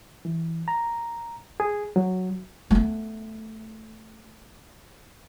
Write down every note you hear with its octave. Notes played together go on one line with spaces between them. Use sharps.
E3
A#5
G#4
F#3
A3 B3